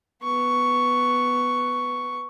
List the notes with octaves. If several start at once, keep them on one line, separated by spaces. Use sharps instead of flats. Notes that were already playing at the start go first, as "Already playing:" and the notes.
B3 C#6